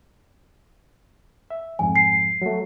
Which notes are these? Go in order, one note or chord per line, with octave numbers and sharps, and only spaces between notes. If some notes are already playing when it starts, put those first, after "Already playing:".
E5
F2 G#2 F3 G#5
C7
F#3 A3